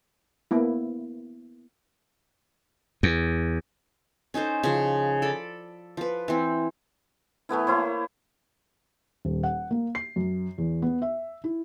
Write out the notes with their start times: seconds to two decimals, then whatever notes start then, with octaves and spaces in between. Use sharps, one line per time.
0.51 A#3 B3 E4
3.03 E2
4.34 C#4 D#4 A4 C5
4.63 C#3 F3
5.22 A4 D5 B5
5.97 F3 B4
6.28 E3 C4
7.49 E3 A3 B3 E4
7.67 A#3 E4 C5 C#5
9.25 D#1
9.43 F#5
9.71 A#3
9.95 C7
10.16 F#2
10.58 E2
10.82 B3
11.02 E5
11.44 E4